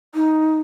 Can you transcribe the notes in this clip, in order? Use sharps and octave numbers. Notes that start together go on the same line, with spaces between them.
D#4